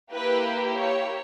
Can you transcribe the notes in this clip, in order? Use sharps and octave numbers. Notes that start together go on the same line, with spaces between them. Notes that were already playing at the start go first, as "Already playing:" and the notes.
A#3 E4 G4 B4
C#5